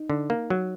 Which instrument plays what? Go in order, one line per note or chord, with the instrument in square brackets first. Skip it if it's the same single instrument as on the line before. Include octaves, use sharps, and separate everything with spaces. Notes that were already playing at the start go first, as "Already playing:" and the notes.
Already playing: [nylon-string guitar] D#4
[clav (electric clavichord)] D3
A#3
F#3